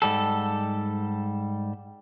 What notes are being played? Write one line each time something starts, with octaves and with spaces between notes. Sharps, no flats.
G#2 G3 A4